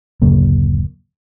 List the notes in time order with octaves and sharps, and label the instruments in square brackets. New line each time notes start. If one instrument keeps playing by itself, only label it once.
[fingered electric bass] D1 F#2 C#3 A#3